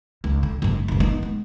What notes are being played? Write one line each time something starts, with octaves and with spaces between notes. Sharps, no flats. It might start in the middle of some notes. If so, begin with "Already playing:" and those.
C#2
D3
F#1 G#2
D2 C3
B3 D#4
G#3